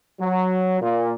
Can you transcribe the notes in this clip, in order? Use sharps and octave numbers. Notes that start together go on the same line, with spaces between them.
F#3
A#2